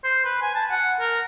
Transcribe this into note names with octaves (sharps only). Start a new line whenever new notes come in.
C5
B4
G#5
A5
F#5
A#4